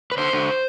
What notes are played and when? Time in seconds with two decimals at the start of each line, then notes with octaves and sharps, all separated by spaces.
0.12 B4
0.18 D3 C5
0.33 D3